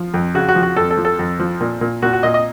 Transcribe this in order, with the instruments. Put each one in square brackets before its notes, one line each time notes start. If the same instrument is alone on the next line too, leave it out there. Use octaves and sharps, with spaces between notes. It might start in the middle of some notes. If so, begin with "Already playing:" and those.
Already playing: [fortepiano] F3
F2
C#3 F#4
F#4
F3
F#4
F2 A4
A4
F3
A4
F2
F3
A#2
A#2
A#2 F#4
F#4
A#2 D#5
D#5